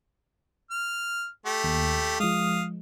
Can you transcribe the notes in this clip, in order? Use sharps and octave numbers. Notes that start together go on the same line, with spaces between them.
F6
A3 G4
D#2
F3 G#3 F5 D#6